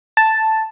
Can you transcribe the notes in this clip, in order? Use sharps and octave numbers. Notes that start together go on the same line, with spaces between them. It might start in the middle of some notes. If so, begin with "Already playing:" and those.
A5